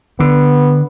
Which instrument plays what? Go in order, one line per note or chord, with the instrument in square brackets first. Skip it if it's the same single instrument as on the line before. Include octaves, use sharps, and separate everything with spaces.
[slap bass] D3 [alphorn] B3